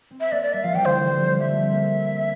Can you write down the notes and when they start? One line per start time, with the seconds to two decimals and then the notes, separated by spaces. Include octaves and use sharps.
0.11 C4
0.20 E5
0.32 A#3 D5
0.42 D5
0.53 G3 E5
0.63 F3 F5
0.74 E3 G5
0.85 D3 C5
1.07 G3
1.17 F3
1.39 G3 E5
1.49 A3
1.60 C4
1.71 A#3